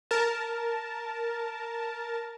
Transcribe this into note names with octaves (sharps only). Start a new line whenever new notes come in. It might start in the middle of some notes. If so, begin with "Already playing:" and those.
A#4 A5